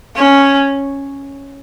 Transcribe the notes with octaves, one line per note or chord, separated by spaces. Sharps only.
C#4